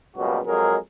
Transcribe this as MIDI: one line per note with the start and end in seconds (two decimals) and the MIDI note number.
0.16 0.40 37
0.16 0.40 47
0.16 0.40 54
0.16 0.40 55
0.16 0.40 58
0.16 0.40 66
0.47 0.77 41
0.47 0.77 54
0.47 0.77 56
0.47 0.77 68
0.47 0.77 70